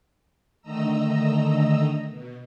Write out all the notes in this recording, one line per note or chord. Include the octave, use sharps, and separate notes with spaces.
D3 D#3 A3 D#5 A#5 E6
B2